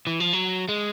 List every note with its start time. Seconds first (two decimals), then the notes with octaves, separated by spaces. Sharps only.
0.07 E3
0.20 F3
0.33 F#3
0.69 G#3